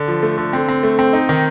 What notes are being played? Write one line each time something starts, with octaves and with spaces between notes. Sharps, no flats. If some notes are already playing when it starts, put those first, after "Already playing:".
Already playing: D3
F3
A3
D3
C4
C4
A3
C4
D#4
D#3